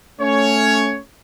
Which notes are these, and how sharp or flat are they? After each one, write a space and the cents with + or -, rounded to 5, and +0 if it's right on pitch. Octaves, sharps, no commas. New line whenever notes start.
A3 +0 C#4 +5 C#5 +10